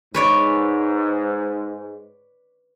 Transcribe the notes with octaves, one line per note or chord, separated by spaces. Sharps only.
G#2 B4 C#5 D5